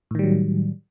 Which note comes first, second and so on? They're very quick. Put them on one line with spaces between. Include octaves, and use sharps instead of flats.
A2 D#3 G3 F#3